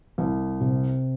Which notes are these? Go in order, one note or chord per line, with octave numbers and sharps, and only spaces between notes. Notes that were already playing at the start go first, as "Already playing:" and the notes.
C2
C3